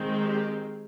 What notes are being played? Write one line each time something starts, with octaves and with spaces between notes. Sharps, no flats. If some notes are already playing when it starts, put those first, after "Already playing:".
Already playing: D#3 G#3 C4
G4